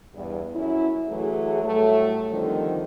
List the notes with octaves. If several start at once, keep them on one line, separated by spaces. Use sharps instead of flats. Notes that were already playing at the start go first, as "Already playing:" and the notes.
E2 G2
F#2 C#4 E4
E3 F#3 A3 G#4
A2 F#3 G3 A3
F2 D3 D#3 F3 G3